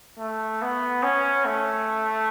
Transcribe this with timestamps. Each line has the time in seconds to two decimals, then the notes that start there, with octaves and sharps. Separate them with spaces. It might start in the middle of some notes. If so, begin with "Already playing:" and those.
0.19 A3
0.62 B3
1.03 C#4
1.45 A3